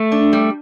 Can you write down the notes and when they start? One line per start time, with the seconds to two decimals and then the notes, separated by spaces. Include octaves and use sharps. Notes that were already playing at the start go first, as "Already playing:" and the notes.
Already playing: A3
0.12 D4
0.33 G3